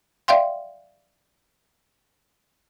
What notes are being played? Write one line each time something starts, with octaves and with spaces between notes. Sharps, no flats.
D5 E5 F5 G5 C6